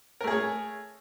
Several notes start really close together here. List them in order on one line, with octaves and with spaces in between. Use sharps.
A#4 A3 G#4 C#5